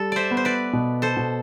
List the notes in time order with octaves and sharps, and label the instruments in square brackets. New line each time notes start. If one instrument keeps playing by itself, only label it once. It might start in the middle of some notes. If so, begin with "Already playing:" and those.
Already playing: [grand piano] G3 [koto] A4
[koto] C5 D5 E5
[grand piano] B3
[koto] C5
B4 D5
[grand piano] B2
[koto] A4 C5
[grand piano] B2